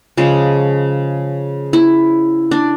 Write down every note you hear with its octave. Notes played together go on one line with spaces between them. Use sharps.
C#3 F3 G#3
E4
D4